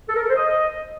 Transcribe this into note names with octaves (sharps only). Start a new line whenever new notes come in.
A4
A#4
A4
C5
D#5